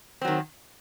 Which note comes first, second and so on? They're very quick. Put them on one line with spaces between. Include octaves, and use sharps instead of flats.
C4 F#3 D#3